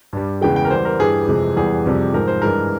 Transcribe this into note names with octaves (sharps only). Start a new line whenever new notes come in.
G2 G3
E2 C#3 E3 G#3 G5
G5
A#4
E2 E3 G3 C5
A#4
G2 E3 G3 G#4
F2 C3 E3 G#3
E2 E3 G3 G#4
F2 C3 G3
G#2 F3 G#3 A#4
C5
G2 E3 G#3 A#4